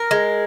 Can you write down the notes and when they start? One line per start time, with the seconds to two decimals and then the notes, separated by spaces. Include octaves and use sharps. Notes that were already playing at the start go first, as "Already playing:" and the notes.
Already playing: A#4
0.11 G#3